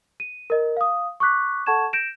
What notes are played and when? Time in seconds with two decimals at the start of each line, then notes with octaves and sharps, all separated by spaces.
0.20 D#7
0.50 A#4 D#5
0.77 F5 D#6
1.20 C#6 D6 F#6 B6
1.66 A4 F#5 A5 C#6 G#6 E7
1.93 G6 A#6 D7 E7